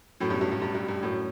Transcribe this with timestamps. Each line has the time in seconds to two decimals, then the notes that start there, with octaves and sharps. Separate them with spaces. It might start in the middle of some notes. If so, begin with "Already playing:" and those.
0.20 F#2 A2
0.30 G2 B2
0.41 G2
0.52 G2
0.62 G2
0.75 G2
0.88 G2
1.03 F#2 A2